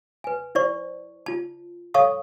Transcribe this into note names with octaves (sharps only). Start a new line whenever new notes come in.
B4 G#5
E4 C5 D5 C#6
F4 A5
A4 C#5 F5 A5 C#6 D#6